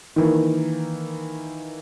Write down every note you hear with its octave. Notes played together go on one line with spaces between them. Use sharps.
D#3 E3 A#3